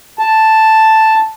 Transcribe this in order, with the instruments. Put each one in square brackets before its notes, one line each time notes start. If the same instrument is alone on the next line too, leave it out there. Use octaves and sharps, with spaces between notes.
[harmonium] A5